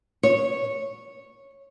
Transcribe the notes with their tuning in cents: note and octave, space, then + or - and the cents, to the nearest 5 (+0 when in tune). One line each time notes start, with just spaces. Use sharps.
C#5 -10